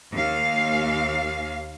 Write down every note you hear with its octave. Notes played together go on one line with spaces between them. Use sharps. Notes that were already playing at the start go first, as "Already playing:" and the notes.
D#2 F5